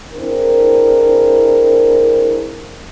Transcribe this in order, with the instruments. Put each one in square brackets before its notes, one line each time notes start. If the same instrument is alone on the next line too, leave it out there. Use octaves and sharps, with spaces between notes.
[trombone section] C4 D4 E4 G#4 A#4